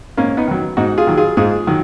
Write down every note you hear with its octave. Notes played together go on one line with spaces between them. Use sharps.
G#2 A#3 C#4
B3 D#4
D#3 F#3
G#2 D#4 F#4
F4 G#4
D#3 F#3
F4 G#4
G#2 F4 G#4
D#3 F#3